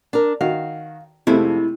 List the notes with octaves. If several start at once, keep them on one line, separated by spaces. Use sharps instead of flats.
D4 A#4
D#3 F#4 F5
F2 C3 G#3 A3 E4